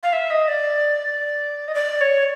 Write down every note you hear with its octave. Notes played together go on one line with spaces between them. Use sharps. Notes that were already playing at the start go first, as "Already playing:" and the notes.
F5
E5
D#5
D5
D#5
D5
C#5